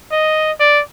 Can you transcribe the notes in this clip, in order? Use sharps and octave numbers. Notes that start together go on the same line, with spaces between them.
D#5
D5